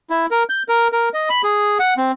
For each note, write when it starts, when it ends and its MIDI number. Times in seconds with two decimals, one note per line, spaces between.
0.10 0.26 64
0.31 0.43 70
0.49 0.63 91
0.69 0.88 70
0.92 1.09 70
1.14 1.29 75
1.30 1.42 83
1.44 1.78 68
1.80 1.94 78
1.97 2.12 60